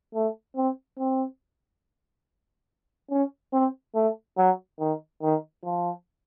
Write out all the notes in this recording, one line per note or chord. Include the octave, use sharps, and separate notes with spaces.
A3
C4
C4
C#4
C4
A3
F#3
D#3
D#3
F3